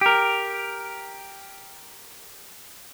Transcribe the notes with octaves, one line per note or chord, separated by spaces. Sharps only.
G4 A#4